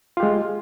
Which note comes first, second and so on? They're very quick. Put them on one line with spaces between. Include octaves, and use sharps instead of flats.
F4 G4 G#3